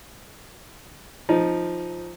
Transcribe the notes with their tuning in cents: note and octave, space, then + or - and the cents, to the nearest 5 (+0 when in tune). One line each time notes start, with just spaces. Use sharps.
F3 +0 D#4 +0